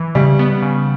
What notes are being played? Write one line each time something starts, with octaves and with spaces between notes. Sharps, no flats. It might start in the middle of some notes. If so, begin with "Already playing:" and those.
Already playing: E3
C#3 G3
B3
C#3